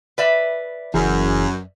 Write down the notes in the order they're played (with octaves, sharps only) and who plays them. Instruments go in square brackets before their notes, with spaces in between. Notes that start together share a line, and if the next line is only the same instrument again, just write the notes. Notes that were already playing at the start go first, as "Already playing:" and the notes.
[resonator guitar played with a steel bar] B4 D5 E5
[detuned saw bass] F#1 [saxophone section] F#2 [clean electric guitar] E3 G#4